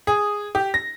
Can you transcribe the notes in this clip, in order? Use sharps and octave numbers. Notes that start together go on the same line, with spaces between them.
G#4
G4
A#6